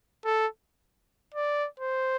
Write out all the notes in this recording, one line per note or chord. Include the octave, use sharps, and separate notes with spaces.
A4
D5
C5